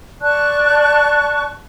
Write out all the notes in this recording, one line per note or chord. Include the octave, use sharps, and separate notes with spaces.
D5 A5 C#6 F#6